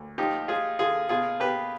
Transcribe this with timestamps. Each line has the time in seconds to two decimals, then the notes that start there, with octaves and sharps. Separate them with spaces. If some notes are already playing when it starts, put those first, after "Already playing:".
Already playing: D2
0.18 F3 D#4 G4
0.48 G#3 F4 G#4
0.79 D3 F4 G#4
1.09 B2 F4 G#4
1.40 B2 G4 B4